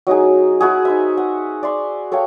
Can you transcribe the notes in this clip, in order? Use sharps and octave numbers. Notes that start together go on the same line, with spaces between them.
F#3 D#4 E4 G#4
E4 F#4 G#4
D#4 C5 E5
F#5
D5 E5 C6
A4 C#5 F5 G5